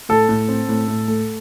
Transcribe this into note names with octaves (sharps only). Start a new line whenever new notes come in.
A2 A4
A2
C4
A2
A2
A3